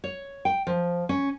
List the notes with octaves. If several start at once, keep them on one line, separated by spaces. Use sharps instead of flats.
C#5
G5
F3
C#4